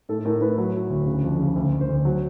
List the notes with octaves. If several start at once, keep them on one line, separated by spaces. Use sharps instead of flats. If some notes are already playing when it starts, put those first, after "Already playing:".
A2 A4
A2 A#4
A2 B4
F#3
F#3
D2
C#3
F2
C#3
D2
D2
C5
D2
F#3